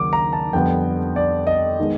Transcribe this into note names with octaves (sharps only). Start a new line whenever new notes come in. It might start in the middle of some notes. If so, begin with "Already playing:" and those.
Already playing: D#2 C#3 F#3 D6
A#5
A5
F2 D3 G3 B3 G5
D5
D#5
D#3 G#3 B3